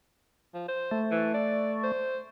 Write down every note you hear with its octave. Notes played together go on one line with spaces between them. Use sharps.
F3
C5
A3
E3
D5
C5